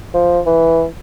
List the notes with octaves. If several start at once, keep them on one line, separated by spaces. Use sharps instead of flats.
F3
E3